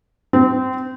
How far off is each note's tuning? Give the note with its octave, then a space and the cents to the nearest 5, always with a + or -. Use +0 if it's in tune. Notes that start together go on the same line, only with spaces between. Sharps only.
C4 -25